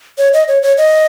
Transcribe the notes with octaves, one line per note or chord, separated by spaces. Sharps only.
C#5
D#5
C#5
C#5
D#5